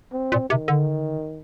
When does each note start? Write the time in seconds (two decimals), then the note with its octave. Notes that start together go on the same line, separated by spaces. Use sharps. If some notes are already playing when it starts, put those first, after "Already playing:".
0.13 C4
0.32 A#2
0.50 C3 D#3
0.68 D3